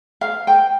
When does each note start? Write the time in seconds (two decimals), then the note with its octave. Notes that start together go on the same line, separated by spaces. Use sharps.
0.21 F5
0.47 G5